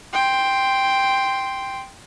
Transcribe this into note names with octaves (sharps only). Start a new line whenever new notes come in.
G5 C6